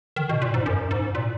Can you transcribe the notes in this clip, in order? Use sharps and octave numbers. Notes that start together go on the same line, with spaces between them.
D#3
B2
A#2
G#2
F#2
G#2
A#2